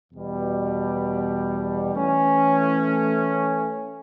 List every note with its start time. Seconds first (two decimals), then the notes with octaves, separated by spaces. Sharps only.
0.12 E2 B2 G3
1.93 E3 A3 C#4